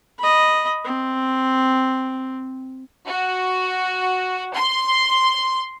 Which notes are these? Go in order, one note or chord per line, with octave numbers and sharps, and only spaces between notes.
D#5 B5
C4
F#4
C6